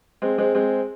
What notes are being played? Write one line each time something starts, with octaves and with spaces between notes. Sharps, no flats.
G#3 C4
G#3 C4
G#3 C4